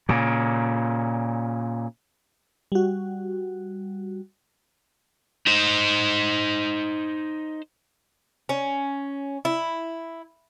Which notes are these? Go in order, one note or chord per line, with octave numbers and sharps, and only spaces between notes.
A#2 C#3
G3 F#4
D#4 C5
C#4
E4